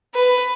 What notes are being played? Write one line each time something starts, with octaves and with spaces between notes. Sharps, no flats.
B4